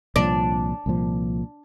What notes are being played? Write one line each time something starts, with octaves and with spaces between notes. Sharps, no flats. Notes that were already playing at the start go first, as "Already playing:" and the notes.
C2 A#2 F3 D4
C2 A#2 F3